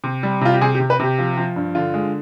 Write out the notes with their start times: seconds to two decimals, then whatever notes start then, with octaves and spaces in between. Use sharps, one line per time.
0.04 C3
0.23 G3
0.41 C3 F4
0.53 G4
0.61 C3 G#4
0.75 G4
0.80 C3
0.90 B4
1.00 C3 G4
1.19 F3
1.38 F3
1.56 G2
1.75 D3 F4
1.94 G#3